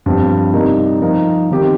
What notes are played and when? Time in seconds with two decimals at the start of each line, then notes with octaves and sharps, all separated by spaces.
0.06 G2 F3 C4
0.53 C3 G3 A#3 D#4 A#4
1.02 F3 D#4 A#4
1.51 D#3 C4 G4